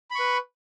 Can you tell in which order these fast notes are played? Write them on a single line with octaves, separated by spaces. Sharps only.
B5 C#6 B4